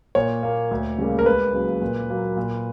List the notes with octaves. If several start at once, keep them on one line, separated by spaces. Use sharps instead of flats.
A#2 C#5
A#3
D2
C#3 G3 A#3
A#4
C#2 B4
C#3 F#3 A#3
A#2
F#3 A#3
A#2